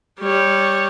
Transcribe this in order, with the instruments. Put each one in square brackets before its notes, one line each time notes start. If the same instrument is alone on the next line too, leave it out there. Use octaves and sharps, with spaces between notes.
[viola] G3 C#5